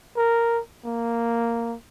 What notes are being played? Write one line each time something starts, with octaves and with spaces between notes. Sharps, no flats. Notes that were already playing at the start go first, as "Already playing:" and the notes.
A#4
A#3